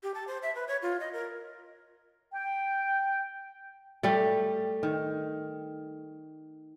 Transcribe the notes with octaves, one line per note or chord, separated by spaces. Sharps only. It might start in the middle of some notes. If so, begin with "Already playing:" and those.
G4
A5
C5
E5
B4
C#5
F4
D#5
A#4
G5
G3 A3
D#3